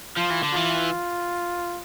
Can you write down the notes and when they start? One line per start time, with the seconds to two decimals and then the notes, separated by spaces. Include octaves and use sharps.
0.17 F3 F4
0.30 E3
0.43 D3
0.54 E3 F4